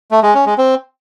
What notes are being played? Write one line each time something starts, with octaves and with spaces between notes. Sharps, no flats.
A3
G#3
C#4
G#3
C4